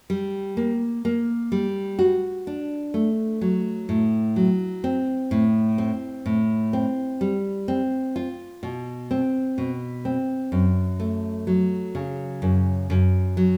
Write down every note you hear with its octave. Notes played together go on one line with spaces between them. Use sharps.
G3
A#3
A#3
G3
F#4
D4
A3
F#3
A2
F#3
C4
A2
C4
A2
C4
G3
C4
F4
B2
C4
B2
C4
F#2
A3
F#3
C#3
F#2
F#2
F#3